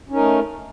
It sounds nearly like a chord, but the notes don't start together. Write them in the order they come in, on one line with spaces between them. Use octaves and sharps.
C#4 D#4 A#4 A3